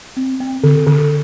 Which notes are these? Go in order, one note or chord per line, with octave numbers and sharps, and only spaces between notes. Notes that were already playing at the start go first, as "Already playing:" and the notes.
C4
C4
D3
D3